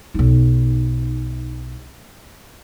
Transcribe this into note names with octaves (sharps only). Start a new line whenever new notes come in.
B1 D#4